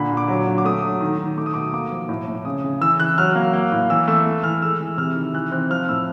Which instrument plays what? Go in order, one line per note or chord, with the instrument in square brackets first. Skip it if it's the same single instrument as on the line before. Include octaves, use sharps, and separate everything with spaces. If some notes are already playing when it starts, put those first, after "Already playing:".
Already playing: [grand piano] A#2 D3 B5
A#2
D6
F#3
D3
D6
A3 D#6
F#3
D#3
D#3
A3 D6
D#6
B2 D6
A#3 D6
F3
A2
A2
C#3 D#6
C#3
E3 E6
E3 F#6
F#3 F6
A#3
A#3
A2
E3 E6
A3 E6
A3
E3 F6
G#3 E6
E3
C3 F6
D#3
E3 F#6
C4 F#6
F3 F6
A2 E6